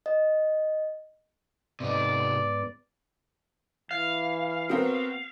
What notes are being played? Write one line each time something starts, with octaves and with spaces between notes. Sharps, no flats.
D#5
G#2 C3 B3 D#4 D5
E3 F5
B3 C4 F#4 A#4